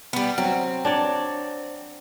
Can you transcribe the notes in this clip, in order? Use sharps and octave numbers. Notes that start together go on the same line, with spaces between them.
G3 B3
F#3 C4
D4 C#5 D5